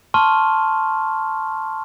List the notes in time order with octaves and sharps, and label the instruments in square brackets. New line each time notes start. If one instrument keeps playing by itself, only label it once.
[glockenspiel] A5 C6 C#6 F6